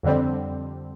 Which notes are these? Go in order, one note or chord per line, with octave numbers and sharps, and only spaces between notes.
F2 D3 G3 C4